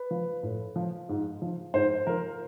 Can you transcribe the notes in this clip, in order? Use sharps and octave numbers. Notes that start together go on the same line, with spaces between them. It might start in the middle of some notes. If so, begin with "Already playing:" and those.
Already playing: B4
F3
A2
F3
G#2
F3
G#2 C5
F3 A#4